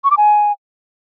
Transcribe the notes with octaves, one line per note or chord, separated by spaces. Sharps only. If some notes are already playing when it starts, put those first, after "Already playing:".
C#6
D6
G#5